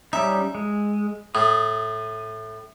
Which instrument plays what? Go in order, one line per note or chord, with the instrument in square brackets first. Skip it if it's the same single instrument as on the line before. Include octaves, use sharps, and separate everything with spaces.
[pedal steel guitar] G3 C#4 D#4 [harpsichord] E5
[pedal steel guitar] G#3
[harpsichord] A2 [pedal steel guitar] D#6